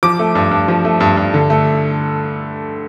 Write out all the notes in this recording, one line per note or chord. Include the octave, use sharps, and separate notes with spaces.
F3 D6
A3
G2
G2
F3
A3
G2
G2
D3
A3